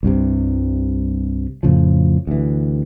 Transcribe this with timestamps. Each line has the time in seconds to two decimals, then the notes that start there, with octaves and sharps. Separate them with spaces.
0.03 C2 G2 C3
1.63 F2 A2 C#3 F3
2.27 D2 E3